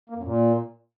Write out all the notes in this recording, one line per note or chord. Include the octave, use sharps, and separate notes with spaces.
A#3
F#2
A#2